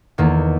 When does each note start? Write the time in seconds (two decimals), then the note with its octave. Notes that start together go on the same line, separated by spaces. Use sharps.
0.18 E2 D#3 A#3